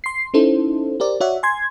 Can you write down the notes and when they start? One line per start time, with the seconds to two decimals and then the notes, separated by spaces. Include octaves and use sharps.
0.04 C6 C7
0.34 C#4 D#4 E4 A4 C5
1.00 G4 A#4 C5 D5
1.20 F#4 C#5 D5 E5 F#5
1.43 G#5 C6 G#6